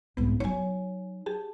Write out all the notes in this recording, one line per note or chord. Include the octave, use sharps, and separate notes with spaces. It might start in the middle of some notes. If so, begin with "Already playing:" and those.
C2 G#2 B3
F#3 D#4 C#5 G#5
G4 G#4 A5